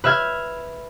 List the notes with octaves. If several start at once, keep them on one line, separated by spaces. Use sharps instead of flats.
B4 E5 F6 G#6